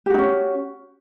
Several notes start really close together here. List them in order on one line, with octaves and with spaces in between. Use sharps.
G4 F#4 D#4 C#4